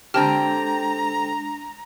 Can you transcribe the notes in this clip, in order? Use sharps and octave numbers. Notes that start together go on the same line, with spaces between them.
D3 G#3 C4 D4 G4 A5 A#5 F6